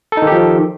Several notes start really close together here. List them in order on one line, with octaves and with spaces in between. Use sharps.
A4 D#4 D#3 G4 F3